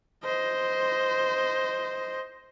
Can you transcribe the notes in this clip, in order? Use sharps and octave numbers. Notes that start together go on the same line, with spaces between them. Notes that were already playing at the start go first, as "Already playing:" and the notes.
C5 D#5